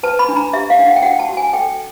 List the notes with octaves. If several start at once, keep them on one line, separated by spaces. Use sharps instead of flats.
B4 A5
B5
D4
A#5
G4 E5
F5
D4
F#5
G5
F#4 F#5
A5
F#4
G#5
A4 G5